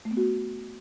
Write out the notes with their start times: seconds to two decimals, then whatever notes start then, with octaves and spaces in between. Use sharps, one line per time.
0.05 A3
0.11 B3
0.17 F#4